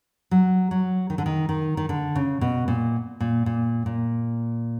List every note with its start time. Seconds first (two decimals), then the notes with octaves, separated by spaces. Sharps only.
0.31 F#3
0.71 F#3
1.10 D#3
1.18 D3
1.26 D#3
1.49 D#3
1.77 D#3
1.89 D3
2.16 C#3
2.41 B2
2.68 A#2
3.20 A#2
3.46 A#2
3.86 A#2